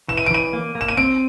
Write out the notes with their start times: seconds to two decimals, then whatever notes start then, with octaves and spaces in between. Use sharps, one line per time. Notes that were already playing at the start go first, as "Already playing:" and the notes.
0.08 E3 E7
0.17 D#7
0.26 D7
0.31 E3 D#7
0.53 A#3
0.75 A#3
0.81 E7
0.88 D#7
0.97 C4 D7